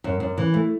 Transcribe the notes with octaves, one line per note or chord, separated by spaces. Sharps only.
F#2
F#2
E3
A3